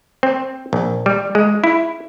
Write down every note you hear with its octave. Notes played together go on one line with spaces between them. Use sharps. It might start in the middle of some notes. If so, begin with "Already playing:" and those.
C4
A#1
G3
G#3
E4